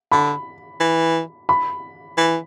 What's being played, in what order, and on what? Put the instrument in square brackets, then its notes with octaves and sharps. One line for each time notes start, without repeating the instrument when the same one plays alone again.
[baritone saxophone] D3 [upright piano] B5
[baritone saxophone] E3
[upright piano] B5
[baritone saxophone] E3